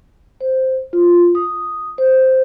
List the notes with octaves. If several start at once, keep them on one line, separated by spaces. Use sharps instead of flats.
C5
F4
D#6
C5